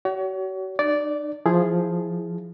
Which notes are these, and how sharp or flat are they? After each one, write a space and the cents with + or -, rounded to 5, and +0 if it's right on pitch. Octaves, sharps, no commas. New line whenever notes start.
F#4 +40 C#5 +35
D#4 -45 D5 -10
F3 +0 E4 +0 G#4 +0